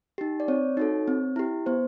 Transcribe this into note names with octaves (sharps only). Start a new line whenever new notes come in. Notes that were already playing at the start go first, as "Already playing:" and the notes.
D#4 G4
D5
C4 C#5
D#4 F#4 A4
C4
E4 G4
B3 C5